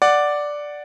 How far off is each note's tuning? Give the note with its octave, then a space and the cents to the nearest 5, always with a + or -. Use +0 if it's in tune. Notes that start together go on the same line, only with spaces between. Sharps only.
D5 +0 F#5 +0